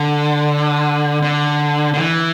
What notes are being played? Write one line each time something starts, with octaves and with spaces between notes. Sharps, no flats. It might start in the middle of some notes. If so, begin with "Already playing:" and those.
Already playing: D3
D3
D3
E3